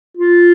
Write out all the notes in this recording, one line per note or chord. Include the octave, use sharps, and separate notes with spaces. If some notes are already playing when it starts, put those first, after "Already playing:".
F4